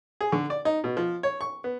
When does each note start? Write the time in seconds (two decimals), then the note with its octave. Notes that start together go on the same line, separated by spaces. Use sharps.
0.21 G#4
0.32 D3
0.50 D5
0.65 D#4
0.84 B2
0.97 F3
1.23 C#5
1.41 C#6
1.64 B3